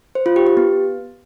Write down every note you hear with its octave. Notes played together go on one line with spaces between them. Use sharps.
C5
F4
G4
G4
B3